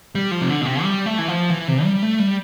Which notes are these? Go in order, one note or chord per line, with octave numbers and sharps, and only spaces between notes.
G3
F3
C3
D3
B2
C3
G3
A3
E3
F3
E3
C3
G3
A3
G3